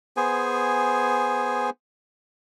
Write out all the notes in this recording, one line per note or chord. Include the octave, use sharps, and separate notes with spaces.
B3 G#4 C5 G#5